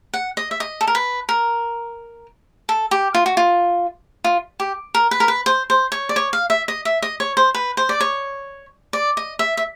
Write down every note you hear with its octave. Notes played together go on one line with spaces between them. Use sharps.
F#5
D#5
E5
D#5
A4
A#4
B4
A#4
A4
G4
F4
F#4
F4
F4
G4
A#4
B4
A#4
B4
C5
C5
C#5
D5
C#5
F5
E5
D#5
E5
D#5
C#5
C5
B4
C5
D5
C#5
D5
D#5
E5
E5